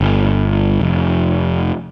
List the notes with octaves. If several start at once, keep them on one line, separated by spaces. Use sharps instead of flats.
G1
F1